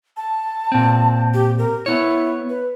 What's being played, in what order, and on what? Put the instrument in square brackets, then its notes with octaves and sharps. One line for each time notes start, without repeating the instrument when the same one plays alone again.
[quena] A5
[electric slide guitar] A#2 C4
[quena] G4
A#4
[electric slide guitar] B3 C#5 [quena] E4
[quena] B4